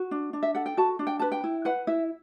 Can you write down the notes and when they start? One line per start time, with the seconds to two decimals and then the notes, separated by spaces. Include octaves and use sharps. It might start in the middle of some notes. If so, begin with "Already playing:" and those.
Already playing: F#4
0.11 D4
0.33 D4
0.43 E5
0.55 A4 F#5
0.66 G5
0.77 F#4 A5
0.99 D4
1.07 G5
1.19 B4 A5
1.32 G5
1.44 E4
1.65 B4 F#5
1.87 E4 E5